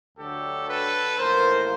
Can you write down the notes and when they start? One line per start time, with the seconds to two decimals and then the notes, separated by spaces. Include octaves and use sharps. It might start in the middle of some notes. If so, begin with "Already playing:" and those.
0.18 D2 D3 F#3 G4 A4
0.68 A4 B4
1.18 A1 A2 F3 A#3 A#4 C5